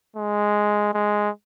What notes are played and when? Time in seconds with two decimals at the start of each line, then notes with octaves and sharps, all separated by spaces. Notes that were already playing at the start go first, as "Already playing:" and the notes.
0.16 G#3
0.94 G#3